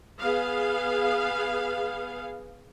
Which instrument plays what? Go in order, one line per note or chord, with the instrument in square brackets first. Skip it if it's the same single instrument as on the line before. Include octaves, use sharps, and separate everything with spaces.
[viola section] B3 G#4 F5